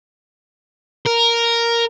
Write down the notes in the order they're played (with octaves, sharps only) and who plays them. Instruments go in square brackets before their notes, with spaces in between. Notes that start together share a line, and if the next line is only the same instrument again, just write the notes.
[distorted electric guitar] A#4